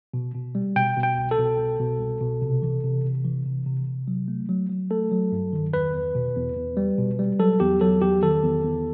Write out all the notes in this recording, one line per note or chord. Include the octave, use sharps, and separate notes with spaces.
B2
B2
G3
B2 G5
B2
G5
C2
A4
B2
C2
B2
C2
B2
C3
E3
C3
C3
E3
C3
C3
C3
F#3
A3
F#3
F#3
A3 A4
F#3
G2
D#3
E2 B4
E2
B2
E2
E2
G3
B2
G3
F#3 A4
E2 G4
F#3 A4
E2 G4
D#3 A4
E2
E2